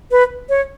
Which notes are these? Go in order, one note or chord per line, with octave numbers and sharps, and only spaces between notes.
B4
C#5